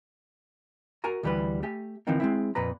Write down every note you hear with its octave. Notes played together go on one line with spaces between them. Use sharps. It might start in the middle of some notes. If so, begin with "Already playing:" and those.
F#4 A#4 G#5 A#5
D2 E3 G3 G4 B4
A3 G4 G#5
D3 E3 F3 A#3 C4 D#4
G#3 C4 E4
F2 A#2 B4 A#5